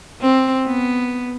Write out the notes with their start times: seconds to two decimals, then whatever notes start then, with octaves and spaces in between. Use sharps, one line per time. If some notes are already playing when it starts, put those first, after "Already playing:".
0.22 C4
0.66 B3